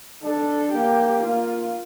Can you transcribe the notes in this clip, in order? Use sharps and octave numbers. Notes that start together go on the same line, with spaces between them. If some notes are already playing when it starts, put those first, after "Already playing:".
D4 A4
A#3 G4
A#3 F4